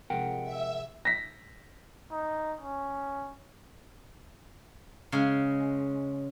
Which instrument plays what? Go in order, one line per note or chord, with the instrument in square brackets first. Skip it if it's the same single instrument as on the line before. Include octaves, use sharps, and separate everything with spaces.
[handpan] C3 F3 G#3 [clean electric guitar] A#4 F#5 G5
[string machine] E5
[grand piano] A#6 B6
[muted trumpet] D#4
C#4
[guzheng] C#3 G#3